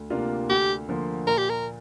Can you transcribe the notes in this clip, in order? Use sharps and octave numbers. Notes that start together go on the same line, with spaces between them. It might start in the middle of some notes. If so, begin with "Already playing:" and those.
Already playing: D2
C3 A#3 D4 F4
D2 G4
D3 F3 A#3
A#2 A#4
G4
A#4